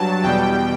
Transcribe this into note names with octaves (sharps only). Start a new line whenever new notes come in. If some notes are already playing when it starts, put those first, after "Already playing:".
Already playing: G2 F#3 A5
E2 B2 G3 G5